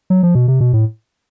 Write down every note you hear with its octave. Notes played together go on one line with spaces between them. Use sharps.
F#3
F3
B2
C3
B2
A2